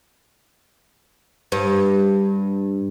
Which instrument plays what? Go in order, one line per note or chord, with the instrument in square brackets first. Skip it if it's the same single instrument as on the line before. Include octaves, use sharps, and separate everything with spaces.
[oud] G2